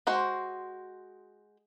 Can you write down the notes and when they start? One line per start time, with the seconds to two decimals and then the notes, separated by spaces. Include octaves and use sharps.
0.07 G#3 F#4 C5